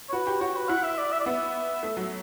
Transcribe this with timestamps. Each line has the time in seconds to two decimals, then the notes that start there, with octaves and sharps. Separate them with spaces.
0.09 C#5
0.12 F#4 B4
0.27 G4
0.40 F#4 C#5
0.56 B4
0.69 E4 F#5
0.83 E5
0.98 D5
1.12 E5
1.20 D5
1.25 B3 E5
1.83 A3
1.97 F#3